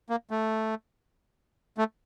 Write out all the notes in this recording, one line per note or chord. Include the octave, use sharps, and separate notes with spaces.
A#3
A3
A3